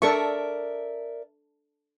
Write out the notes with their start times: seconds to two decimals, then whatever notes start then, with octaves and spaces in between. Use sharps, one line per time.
0.02 D4 A4 A#4 D5 E5 C#6